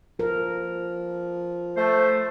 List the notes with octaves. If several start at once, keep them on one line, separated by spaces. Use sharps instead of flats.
F3 A#4
A3 C5